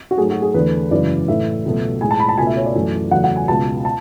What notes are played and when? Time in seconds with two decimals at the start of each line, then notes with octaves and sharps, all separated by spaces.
0.11 F#4
0.17 G#2 F#3 A3 G#4
0.31 F#4
0.42 G#4
0.54 E2 D3 A3 B4
0.91 F#2 C#3 E3 G#3 D5
1.28 A2 E3 A3 E5
1.65 C#2 B2 F#3 A3
2.01 A2 G#3 G#5
2.11 A5
2.20 B5
2.29 A5
2.38 C#2 B2 A3 G#5
2.47 E5
2.57 C#5
2.66 D5
2.75 F#2 E3 A3
3.11 E2 C#3 F#3 A3 F#5
3.24 F#5
3.36 G#5
3.48 C#2 B2 G#3 A5
3.85 A5